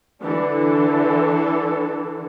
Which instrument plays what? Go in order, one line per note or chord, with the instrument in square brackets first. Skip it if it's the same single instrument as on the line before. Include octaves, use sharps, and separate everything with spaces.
[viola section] D3 E3 D4 A4